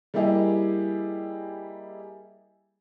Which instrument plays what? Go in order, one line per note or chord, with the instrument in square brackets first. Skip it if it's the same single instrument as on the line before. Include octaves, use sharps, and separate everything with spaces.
[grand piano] G3 A#3 E4 G4 G#4 D#5